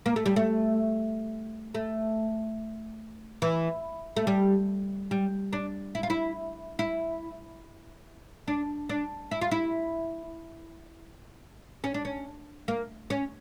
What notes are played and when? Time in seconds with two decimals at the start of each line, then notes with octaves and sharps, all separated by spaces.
0.06 A#3
0.16 A3
0.26 G3
0.36 A3
1.74 A3
3.42 E3
4.16 A3
4.27 G3
5.11 G3
5.53 D4
5.95 E4
6.03 F4
6.10 E4
6.79 E4
8.48 D4
8.89 D4
9.31 E4
9.41 F4
9.51 E4
11.84 C#4
11.94 D4
12.05 C#4
12.68 A#3
13.10 C#4